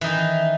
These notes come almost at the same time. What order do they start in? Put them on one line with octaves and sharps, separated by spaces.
E3 D#4 D#3